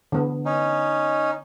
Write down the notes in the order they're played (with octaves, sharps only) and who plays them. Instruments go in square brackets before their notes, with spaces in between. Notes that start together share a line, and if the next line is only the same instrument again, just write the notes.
[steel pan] D3 B3
[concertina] C#4 D#4